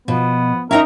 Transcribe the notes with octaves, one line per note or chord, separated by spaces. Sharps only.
B2 F3 B3
C#4 D#4 A#4 E5 F5 A#5